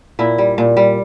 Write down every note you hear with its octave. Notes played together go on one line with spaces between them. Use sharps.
A#2 E4
G3
A#2
G3